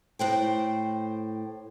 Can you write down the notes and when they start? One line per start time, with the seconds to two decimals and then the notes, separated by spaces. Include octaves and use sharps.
0.19 A2 C5 G5